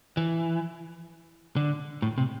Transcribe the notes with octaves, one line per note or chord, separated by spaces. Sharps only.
E3
D3
A2
C3